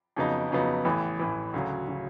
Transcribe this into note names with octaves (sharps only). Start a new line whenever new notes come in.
F2 C#3 F#3 B3 D#4
F2 C#3 F#3 B3 D#4
A1 A2 E3
A1 A2 E3
D2 C#3 F#3
C#3 F#3